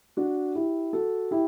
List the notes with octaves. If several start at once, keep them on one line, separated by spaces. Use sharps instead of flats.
D4 F#4
E4 G4
F#4 A4
E4 G4